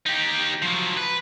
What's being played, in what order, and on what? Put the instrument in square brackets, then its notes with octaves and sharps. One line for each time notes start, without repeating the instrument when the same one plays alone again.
[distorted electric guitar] D#4 G4
F3 F#3
B4